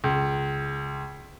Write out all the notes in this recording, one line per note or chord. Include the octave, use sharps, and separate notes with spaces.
C#2